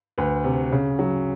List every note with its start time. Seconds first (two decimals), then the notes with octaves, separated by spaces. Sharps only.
0.18 D2 B4
0.44 C3
0.72 C#3
0.99 F#3